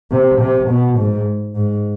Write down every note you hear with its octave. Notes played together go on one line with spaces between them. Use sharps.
C3
C3
B2
G#2
G#2